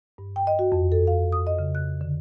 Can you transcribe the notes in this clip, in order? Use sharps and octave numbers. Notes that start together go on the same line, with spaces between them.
G2
G5
D#5
F#4
F2
A4
F5
D#6
D#5
C#3
F#6
D3